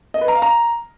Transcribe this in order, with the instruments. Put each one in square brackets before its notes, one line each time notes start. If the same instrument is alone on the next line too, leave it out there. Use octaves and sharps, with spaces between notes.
[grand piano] D#5
B4
A#5
F5
A#5